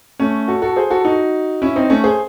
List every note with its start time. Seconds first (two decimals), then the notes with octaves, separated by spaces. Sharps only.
0.19 A3 C#4
0.48 F#4 A4
0.62 F#4 A4
0.76 G#4 C5
0.90 F#4 A4
1.05 D#4 F#4
1.62 C#4 E4
1.76 C4 D#4
1.90 A3 C#4
2.04 G#4 C5